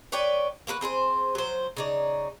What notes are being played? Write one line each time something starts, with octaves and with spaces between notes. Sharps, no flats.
B4 C#5 D5 G5
A#3 F#4 A#4 B4
C4 G#4 A4 C5
F#3 C5
C#3 D#4 D5